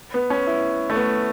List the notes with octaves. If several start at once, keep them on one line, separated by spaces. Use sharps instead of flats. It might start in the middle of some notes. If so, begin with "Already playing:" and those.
B3
C#4
E4
A3
B3